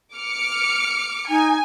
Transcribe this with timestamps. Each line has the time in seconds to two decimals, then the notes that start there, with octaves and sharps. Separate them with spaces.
0.15 D6 F6 C#7
1.30 D#4 G#5